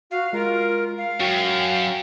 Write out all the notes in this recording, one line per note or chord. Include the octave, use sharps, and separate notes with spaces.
F#4 F5
G#3 F4 A#4
F5
F#2 F#4 G5